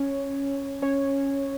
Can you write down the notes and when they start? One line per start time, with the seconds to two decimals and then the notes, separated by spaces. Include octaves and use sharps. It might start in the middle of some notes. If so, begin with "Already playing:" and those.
Already playing: C#4 C#5
0.82 C#4 C#5